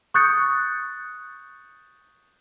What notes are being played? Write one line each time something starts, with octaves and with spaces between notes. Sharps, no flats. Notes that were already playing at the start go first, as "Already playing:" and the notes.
C#6 D#6 F#6 G6 A6 C#7